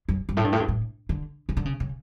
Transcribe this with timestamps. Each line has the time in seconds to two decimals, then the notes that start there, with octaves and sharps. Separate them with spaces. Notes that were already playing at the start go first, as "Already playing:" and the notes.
0.09 F#2
0.29 G2
0.37 A2
0.44 G2
0.52 A2
0.60 G2
0.68 A2
1.09 D3
1.49 C#3
1.57 D3
1.65 C#3
1.80 C#3